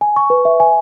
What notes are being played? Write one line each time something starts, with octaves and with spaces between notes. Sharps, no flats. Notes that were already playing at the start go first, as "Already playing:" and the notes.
G#5
C#6
B4
E5
G#5